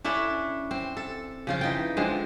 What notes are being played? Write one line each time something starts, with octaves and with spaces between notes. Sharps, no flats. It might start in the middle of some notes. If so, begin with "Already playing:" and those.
C#4 D4 E4 A4
C4
A4
C#3 F3 F4
E3 D#4 G5
D3 F3 G#3 C4